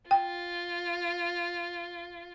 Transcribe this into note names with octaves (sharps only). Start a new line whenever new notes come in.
F4 G5